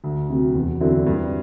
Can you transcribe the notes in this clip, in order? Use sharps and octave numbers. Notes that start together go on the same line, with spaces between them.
D2
C3 F#3
E2
D3 F#3 C4 E4
G2